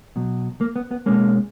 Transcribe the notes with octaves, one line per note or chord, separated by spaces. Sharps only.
B2 F#3
A#3
B3
B3
B2 G#3 A#3 C#4